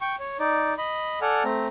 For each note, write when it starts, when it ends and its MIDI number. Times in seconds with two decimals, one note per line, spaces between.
0.01 0.16 79
0.01 0.16 85
0.20 0.37 73
0.40 0.74 63
0.40 0.74 74
0.78 1.19 75
0.78 1.19 83
1.21 1.43 69
1.21 1.43 74
1.21 1.43 78
1.21 1.43 80
1.21 1.43 89
1.44 1.68 57
1.44 1.68 60
1.44 1.68 82